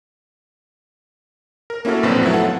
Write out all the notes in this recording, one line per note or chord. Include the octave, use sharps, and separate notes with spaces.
A#4
A#3 C#4 E4 F#4 A4
A#1 F#2 B2 D3 C4 B4
F3 F#3 A3 B3 E4
A4 F#5
F4